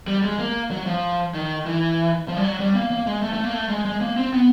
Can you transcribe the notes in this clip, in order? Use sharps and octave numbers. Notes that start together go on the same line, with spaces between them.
G3
G#3
A#3
F#3
F3
D#3
E3
F3
G3
F#3
G3
A#3
A#3
G#3
A3
A3
A#3
A3
G#3
G#3
A#3
C4
B3